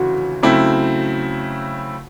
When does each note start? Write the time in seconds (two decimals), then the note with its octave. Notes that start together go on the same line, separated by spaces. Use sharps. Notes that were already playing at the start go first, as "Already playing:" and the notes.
Already playing: D2 C#3 E3 F#4
0.43 C#3 F#3 A3 C4 E4